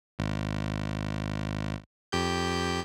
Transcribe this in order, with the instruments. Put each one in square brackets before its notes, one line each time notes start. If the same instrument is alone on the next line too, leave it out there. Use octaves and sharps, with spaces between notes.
[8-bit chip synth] G#1
F2 G4 G6